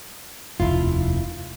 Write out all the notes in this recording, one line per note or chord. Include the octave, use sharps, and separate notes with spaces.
F1 D#2 E4 F4